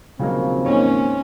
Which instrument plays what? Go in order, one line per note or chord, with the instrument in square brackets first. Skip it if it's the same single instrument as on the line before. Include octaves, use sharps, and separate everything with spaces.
[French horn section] D#2 F3 C4 [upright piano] C#3 F#3 A#3
[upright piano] G#2 [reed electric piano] A#3 C#5 [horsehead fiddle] C#4